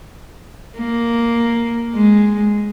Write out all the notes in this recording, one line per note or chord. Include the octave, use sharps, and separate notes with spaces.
A#3
G#3